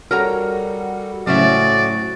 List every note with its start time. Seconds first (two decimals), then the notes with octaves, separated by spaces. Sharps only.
0.11 G3 F#4 A4 A#4 C#5 F#5 A#5
1.27 A2 C#3 F#3 A3 F#4 C5 D5 E5